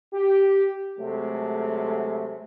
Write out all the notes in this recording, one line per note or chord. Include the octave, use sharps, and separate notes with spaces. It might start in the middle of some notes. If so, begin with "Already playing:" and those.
G4
C3 F#3 G#3 A3